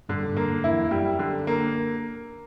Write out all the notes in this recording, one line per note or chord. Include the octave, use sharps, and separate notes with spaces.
G2 D3
G2
A#3
F#2
E4
E2
F#2 G3
D3
A#3